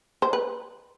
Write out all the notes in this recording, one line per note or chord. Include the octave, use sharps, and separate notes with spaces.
C5
B4